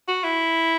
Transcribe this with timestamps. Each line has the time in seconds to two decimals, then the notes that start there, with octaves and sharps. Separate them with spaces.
0.08 F#4
0.24 E4